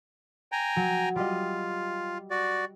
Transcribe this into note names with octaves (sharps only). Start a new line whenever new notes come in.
G5 G#5 A#5
F#3
G3 F4 D#5
F#4 D5